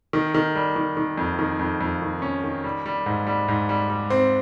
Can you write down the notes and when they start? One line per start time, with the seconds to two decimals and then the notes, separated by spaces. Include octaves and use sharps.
0.13 D#3
0.35 D#3
0.55 G3
0.76 D#3
0.97 D#3
1.18 F2
1.39 D#3
1.59 F2
1.81 F2
2.02 D#3
2.22 C#4
2.44 D#3
2.64 G3
2.86 G3
3.06 G#2
3.27 G3
3.48 G#2
3.69 G3
3.90 G3
4.10 C4